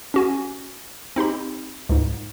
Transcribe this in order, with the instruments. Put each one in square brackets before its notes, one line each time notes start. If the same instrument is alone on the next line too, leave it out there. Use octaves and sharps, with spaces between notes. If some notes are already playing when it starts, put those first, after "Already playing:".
[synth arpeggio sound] C#4 F#4 G#5
C4 D#4 G4 B5
C#2 G#2